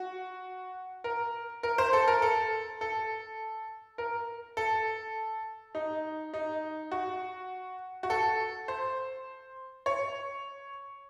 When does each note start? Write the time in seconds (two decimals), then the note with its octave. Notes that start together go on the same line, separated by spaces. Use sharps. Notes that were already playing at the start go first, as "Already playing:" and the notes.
Already playing: F#4
1.04 A#4
1.63 A#4
1.78 C5
1.93 A4
2.08 A#4
2.22 A4
2.81 A4
3.98 A#4
4.57 A4
5.75 D#4
6.34 D#4
6.92 F#4
8.03 F#4
8.10 A4
8.68 C5
9.86 C#5